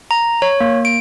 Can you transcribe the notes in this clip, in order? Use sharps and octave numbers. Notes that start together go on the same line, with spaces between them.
A#5
C#5
A#3
D7